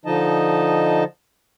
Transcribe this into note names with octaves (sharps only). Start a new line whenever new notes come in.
D3 F3 D#4 D#5 A5